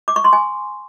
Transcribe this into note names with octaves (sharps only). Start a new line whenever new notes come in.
D6
C#6
C6
G#5